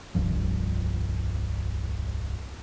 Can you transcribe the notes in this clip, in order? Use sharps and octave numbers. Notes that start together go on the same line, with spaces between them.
D#1 C2 G2 F3